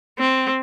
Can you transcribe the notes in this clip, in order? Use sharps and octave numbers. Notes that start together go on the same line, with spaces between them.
C4